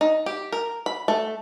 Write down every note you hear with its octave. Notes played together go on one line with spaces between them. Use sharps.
D#4
G4
A#4
B5
A3